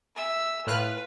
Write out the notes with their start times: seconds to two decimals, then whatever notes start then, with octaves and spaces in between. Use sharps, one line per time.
0.16 E5 E6
0.67 A2 F4 B4 F6 F#6